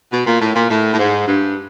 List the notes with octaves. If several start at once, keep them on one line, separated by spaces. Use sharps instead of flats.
B2
A#2
A2
A#2
A2
A2
G#2
G2